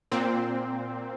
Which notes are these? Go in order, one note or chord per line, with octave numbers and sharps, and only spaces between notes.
A#2 C4